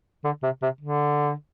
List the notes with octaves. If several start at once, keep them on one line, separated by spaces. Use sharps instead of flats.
D3
C3
C3
D3